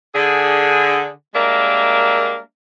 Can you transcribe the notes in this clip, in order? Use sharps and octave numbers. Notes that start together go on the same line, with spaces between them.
D3 G#4
G3 G#3 A#3 D4 A#4 E5